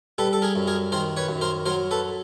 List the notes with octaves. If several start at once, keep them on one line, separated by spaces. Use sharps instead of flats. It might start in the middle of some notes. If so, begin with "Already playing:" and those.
G3 A4 B4
A4
G#4 A#4
F#2
G#4 A#4
D#3 A#4 C5
B4 C#5
F#2
A#4 C5
F#3 A#4 C5
A4 B4